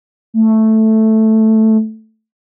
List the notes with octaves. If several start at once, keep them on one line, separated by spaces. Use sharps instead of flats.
A3